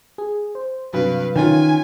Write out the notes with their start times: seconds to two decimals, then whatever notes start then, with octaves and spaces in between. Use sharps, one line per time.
0.18 G#4
0.55 C5
0.94 G2 C3 F#3 B4 F5
1.36 D#3 E3 C#4 F4 G#5